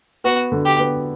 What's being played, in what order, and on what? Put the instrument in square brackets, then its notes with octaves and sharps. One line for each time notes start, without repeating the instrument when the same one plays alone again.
[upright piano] B3 [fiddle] F#4
[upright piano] D3
[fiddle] G4
[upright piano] B3